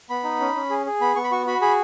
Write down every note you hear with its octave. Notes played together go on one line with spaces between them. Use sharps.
B3 B5
D#4
C#4
C#4
G#4
G#4
B3 B5
B3 C#6
B5
F#4 C#6
F#4 B5
G#4 B5